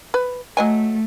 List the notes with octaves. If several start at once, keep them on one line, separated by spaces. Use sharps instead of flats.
B4
F#3 A3 D#5 G#5